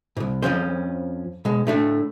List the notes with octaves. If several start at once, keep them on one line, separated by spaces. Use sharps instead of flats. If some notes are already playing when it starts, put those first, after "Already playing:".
C2 G#2
F2 F3 C#4 C5
B2 G#3
A2 A3 D4